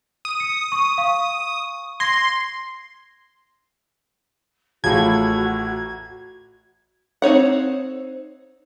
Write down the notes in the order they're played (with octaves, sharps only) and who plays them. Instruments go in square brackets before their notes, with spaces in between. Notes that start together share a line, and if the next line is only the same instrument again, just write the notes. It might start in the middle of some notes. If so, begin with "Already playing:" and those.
[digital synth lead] D#6
[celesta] C#7
C#6
F5 C#6
[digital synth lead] C6 [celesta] G#6 A#6
[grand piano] A1 A2 [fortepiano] F3 G#4 [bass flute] F#4 [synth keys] G#6
[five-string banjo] C4 D#4 C#5 F#5